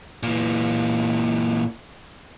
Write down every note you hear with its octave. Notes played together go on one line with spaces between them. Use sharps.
A#2 E3